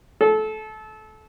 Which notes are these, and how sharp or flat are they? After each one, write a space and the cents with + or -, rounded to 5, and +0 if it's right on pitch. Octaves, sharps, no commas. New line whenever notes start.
A4 -25